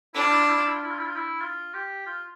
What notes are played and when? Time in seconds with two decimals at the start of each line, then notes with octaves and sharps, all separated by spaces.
0.15 D4 E4
0.23 F4
0.31 E4
0.40 F4
0.49 E4
0.56 F4
0.66 E4
0.74 F4
0.82 E4
0.91 F4
0.99 E4
1.07 F4
1.16 E4
1.42 F4
1.74 G4
2.07 F4